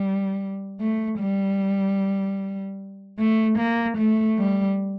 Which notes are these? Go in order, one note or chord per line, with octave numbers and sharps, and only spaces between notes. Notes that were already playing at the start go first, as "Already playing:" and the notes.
Already playing: G3
A3
G3
A3
A#3
A3
G3